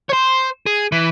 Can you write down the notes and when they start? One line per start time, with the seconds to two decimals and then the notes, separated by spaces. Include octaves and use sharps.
0.09 C5 C#5
0.67 G#4
0.92 E3